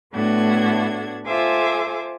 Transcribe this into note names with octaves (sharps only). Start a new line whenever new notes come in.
A2 A3 B3 D4 F#4 G#6
F4 A4 C5 E5 G#5 D6